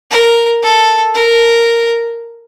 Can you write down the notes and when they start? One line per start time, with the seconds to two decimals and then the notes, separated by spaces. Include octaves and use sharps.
0.11 A#4
0.63 A4
1.15 A#4